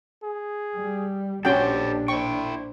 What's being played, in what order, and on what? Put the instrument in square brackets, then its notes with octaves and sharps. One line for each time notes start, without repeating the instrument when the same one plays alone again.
[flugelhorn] G#4
[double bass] G3
[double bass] A#1 D4 [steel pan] C#4 F#4 G5 [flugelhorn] G4 [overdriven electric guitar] A4 C5
[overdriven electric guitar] E4 G5 [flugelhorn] C5 [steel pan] C#6